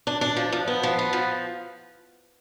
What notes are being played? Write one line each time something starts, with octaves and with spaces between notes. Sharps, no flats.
D4
D4
F3
F3
B3
F3
B3
F3